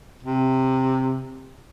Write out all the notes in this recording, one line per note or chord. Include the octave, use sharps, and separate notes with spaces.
C3